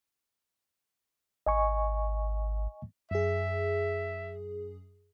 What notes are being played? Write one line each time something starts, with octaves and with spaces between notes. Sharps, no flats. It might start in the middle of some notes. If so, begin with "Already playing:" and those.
G#1 D#5 G#5 C#6
F#2 G#4 E5